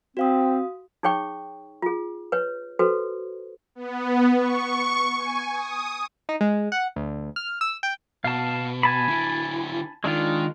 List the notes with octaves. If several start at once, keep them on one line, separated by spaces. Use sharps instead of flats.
C4 F#4 F5 D#6
D#4 G#4 C#5 G5 C#6
F4 G#4
B4 C#5
F#4 A4 B4 C5
B3
C#6
G#5
D#6
D#4
G#3
F#5
D2
F6
E6
G5
B2 F5 A5
G#5 A5 B5
D3 E4
D#3 G#3 D4 F4